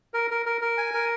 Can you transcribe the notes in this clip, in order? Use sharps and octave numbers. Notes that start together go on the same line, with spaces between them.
A#4
A#4
A#4
A#4
G#5
A#4